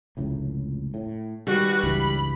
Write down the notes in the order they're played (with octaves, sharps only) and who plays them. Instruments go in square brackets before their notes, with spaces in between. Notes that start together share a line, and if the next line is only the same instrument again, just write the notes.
[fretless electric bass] F1 C#2 A2
A2
[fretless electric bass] D#3 [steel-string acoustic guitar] G3 [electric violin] F#4 B4
[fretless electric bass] C#2 G2 E3 [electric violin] B5